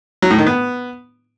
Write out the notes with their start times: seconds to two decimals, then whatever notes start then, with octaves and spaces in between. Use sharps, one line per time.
0.22 F#3
0.30 A2
0.38 D#3
0.47 B3